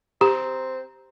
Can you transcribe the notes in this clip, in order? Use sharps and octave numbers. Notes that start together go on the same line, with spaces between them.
C4 G4 A#5